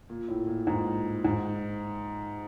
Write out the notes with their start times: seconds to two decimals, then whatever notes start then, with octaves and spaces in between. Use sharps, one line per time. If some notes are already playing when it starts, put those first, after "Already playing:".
0.10 A#2
0.28 A2
0.47 A#2
0.67 G#2
1.25 G#2